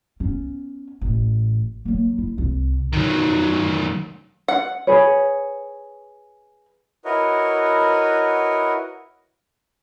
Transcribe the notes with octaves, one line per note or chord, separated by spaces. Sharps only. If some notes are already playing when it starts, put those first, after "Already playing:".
B3 C#4
A1
F#3 A#3
E4
C2
D#3 F#3
F#5
G#4 B4 C#5
E4 F#4 A#4 B4 C#5 D#5